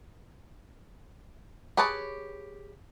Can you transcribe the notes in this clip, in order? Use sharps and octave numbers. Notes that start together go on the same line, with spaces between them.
G4 G#4 B4 C#5 A5